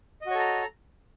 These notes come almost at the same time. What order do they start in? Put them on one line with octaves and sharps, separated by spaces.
D#5 F#4 C#5 A4 A#5